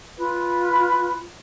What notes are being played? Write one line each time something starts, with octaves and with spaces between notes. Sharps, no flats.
F4 B4